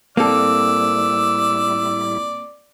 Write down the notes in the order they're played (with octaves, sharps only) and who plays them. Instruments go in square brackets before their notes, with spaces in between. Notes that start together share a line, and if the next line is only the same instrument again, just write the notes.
[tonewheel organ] A2 G3 E4 [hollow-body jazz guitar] A#3 C4 A4 [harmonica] D5 [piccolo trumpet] E6